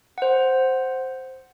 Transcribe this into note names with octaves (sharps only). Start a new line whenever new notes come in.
C5 F#5